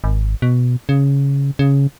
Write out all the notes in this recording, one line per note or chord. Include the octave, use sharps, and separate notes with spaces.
G#1
B2
C#3
C#3